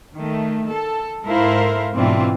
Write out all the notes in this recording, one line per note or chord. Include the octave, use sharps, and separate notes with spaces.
D#3 A3
A4
G#2 E4 A4 A#4 C5 F5
G#2 B2 E3 C4 D4 F4